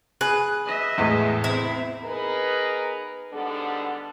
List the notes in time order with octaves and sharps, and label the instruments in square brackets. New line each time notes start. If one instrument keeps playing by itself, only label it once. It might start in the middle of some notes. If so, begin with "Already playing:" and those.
[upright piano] G#4 [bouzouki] B4
[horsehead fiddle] D#5 E5
[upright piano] E2 A2 G#3
[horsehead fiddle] B3 C4 [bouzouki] E4
[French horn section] B3 D#4 G#4 A#4 B4
G#2 D3 G3 B3 D4 A4